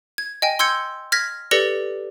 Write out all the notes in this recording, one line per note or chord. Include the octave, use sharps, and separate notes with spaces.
G#6
D#5 G5 G#5
C6 E6 G6 G#6 C#7
F6 G#6 A#6 B6
G4 A4 B4 D5 A#6 C#7